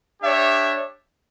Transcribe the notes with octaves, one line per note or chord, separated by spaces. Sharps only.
D4 G4 C#5 E5